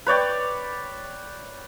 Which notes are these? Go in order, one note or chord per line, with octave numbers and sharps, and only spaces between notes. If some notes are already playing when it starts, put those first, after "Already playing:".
B4 C#5 D5 G5